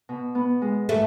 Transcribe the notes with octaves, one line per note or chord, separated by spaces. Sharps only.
B2
B3
G#3
A3